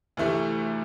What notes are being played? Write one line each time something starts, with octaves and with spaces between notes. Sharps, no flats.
D2 C3 E3 A3 E4